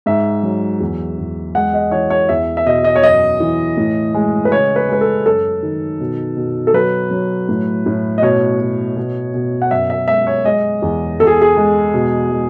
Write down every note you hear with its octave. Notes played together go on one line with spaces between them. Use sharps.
G#2 E5
F#3
E2
E2
G#3 F#5
D#5
E3 C#5
C#5
E2 E5
E5
B2 D#5
D#5
C#5
F#2 D#5
E3
A2
G#3
B4
C#3 C#5
B4
G#3 B4
A4
F#2 A4
D#3
B2
B2
A4
F#3 B4
F#3
A2
A2
D#5
B2 C#5
B2
B2
B2
F#5
F#2 E5
E5
G#3 E5
C#5
G#3 D#5
E2
E2 A4
G#4
G#4
G#3
B2
G#3